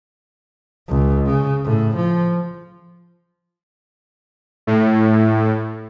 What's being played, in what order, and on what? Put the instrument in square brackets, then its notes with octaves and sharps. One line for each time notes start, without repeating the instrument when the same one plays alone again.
[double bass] C#2
C#3
A2
F3
[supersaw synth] A2